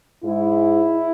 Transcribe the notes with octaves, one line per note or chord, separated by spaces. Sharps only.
G#2 G#3 E4